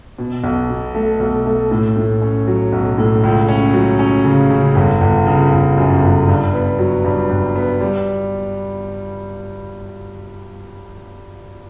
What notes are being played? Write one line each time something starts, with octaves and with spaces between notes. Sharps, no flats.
B2
B1
B2
A3
B1
A3
A2
A2
C#4
F#3
B1
A2
C#2
C#4
F#3
C#4
C#3
C#3
G1
G1
C#3
G1
F#2
G1
G2
B3
F#3
G2
G2
B3
G3